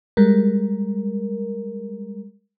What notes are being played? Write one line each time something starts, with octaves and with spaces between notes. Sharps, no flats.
G3 G#3 A#4